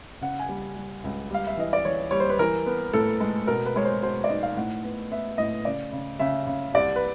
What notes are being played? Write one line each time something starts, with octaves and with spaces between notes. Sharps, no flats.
C#3 F#5
G#5
G3
G3
C#2
G3 F5
E5
E3 D#5
D5
E3 C#5
G3 C#5
C5
B4
E3 A#4
B3
A2 A4
G#3
B2 A#4
B4
G#3 C#5
C5
B2 C5
D5
D#4 D#5
F5
A2 F#5
B3
B3 E5
A2 D#5
C#3 D5
C#3
C#3 E5
C#3
C2 D5
B4